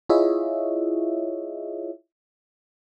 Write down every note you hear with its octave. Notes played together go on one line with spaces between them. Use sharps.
E4 F4 G#4 C#5 D#5 E5